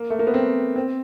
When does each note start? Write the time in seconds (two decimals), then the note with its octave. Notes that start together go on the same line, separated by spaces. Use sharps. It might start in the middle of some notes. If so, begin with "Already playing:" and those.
Already playing: A#3
0.10 A3
0.19 A#3
0.27 B3
0.34 C4
0.76 C4